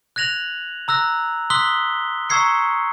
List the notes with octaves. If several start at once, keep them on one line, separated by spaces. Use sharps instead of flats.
F#6 G#6 A#6 F7 F#7
A#5 E6 F#6 A#6
C6 D#6 E6 F#6 B6 G7
A#5 C#6 E6 G#6 C7 C#7